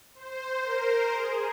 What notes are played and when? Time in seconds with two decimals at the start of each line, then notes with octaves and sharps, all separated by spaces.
0.15 C5
0.63 A#4
1.12 G#4